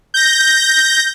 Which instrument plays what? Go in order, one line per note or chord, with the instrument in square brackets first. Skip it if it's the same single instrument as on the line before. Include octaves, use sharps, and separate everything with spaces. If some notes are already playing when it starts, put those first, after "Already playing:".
[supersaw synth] G6 A#6